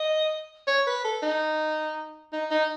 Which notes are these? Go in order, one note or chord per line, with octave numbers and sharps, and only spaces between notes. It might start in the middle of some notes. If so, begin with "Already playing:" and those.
Already playing: D#5
C#5
B4
A4
D#4
D#4
D#4